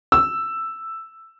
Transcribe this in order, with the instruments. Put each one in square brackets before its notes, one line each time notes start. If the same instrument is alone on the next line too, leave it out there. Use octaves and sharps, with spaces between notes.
[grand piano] E6